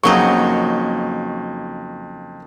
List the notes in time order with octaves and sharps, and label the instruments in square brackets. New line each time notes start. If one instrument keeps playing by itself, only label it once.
[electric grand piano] F2 A#3 C#6 [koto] C#3 F#3 D#4